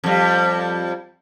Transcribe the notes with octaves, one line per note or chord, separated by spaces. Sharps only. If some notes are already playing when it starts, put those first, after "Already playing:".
F2 G3